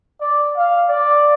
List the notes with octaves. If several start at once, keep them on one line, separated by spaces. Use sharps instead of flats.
D5
F5
D5